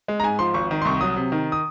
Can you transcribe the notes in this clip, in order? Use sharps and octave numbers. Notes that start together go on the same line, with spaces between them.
G#3
A#5
G#2 G#5
F3 C6
G#1 C#6
D#3
C6
C2 C#6
F#3 D#6
C3
D#3
D#6